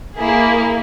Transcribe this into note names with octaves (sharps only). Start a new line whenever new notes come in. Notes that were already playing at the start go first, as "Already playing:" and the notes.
A#3 E4 G#4